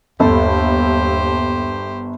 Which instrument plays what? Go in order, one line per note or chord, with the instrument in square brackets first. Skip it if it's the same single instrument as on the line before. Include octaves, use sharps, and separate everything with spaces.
[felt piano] G1 A4 [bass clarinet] D#2 [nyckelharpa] G4 C5